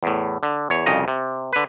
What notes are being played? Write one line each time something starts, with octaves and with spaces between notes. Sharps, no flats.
E2 A2
D3
E2 C#5
C2 F2 C#3 D#5 A#5
C3
D3 B4